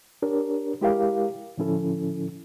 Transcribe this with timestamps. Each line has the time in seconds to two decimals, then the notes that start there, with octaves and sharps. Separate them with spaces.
0.22 D4 G4 A#4 C#5
0.81 G#3 E4 G4 A#4 C#5 F5
1.58 A2 D3 F3 C#4 E4 A4